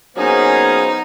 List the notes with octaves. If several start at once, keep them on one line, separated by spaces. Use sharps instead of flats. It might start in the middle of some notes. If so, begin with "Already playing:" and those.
F#3 A#3 B3 C#4 D#4 G#4 C5